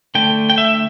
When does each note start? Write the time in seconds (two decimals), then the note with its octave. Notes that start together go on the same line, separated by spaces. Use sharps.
0.15 D3 A3 G5
0.50 G5
0.58 E5